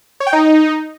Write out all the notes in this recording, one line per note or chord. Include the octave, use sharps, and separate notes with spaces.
C#5
G5
D#4